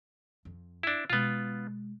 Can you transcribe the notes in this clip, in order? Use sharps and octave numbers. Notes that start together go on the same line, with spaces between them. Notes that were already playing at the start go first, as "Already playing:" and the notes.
F2
D4 E4
B2 G#3 B3 F4